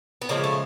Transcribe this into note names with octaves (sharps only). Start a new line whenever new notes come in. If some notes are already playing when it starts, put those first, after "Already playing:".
B3
C#3 F3 G#3 A#3
A3